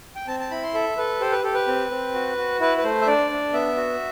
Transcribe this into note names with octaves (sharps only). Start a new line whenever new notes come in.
G5
C4 A5
A5
E4 B5
C6
A4 E5
A4 B4
G4 C5
B4
G4 A4
B4
C4
C4
F#4
F#4
E4 B4
B4
A3 C5
E5
D4 D5
D4
B3 E5
F#4